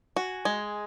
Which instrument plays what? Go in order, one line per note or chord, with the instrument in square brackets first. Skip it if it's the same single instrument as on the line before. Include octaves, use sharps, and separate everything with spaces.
[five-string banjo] F#4 [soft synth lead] G#5
[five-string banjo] G#3